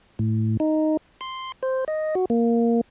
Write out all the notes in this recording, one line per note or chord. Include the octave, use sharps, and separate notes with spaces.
A2
D#4
C6
C5
D#5
F#4
A#3